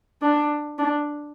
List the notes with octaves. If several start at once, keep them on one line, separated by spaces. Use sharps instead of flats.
D4
D4